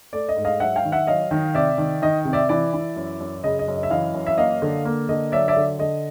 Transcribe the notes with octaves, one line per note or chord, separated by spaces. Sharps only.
A3 D5
D#5
G#2
D#5 F5
F#3 E5 F#5
F5 G5
D#3
E5 F#5
F#3 D#5 F5
D#3
C3 D5 E5
D#3
D#3 D#5
C3
D5 E5
E3 D5 E5
E3
F#2
F#2
C#3 D#5
D#5
F#2
D#5
E5
E3 D#5 F5
F#2
E5
A#3 D#5 F5
D3
A#3
D3 D#5
F#3 D5 E5
D5 E5
D3
D3 D#5